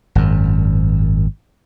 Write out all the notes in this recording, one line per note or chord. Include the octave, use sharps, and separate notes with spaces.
G#1 F#2